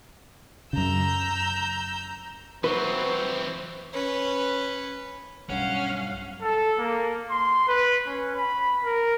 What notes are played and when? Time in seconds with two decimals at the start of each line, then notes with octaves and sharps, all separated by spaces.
0.73 F#2 C#3 A#5 E6 G6
2.64 E3 F#3 C4 B4 C5
3.93 C#4 B4
5.50 B1 G2 C#4 F5 F#5
6.42 A4
6.79 A#3
7.31 C6
7.68 B4
8.06 C#4
8.36 B5
8.85 A#4